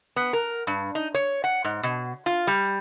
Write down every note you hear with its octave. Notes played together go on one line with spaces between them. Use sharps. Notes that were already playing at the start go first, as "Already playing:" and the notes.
B3
A#4
G2
D#4
C#5
F#5
G#2
B2
F4
G3